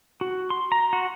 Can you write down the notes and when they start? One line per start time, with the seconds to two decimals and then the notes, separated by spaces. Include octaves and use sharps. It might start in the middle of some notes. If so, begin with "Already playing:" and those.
0.21 F#4
0.50 C6
0.72 A#5
0.93 F#4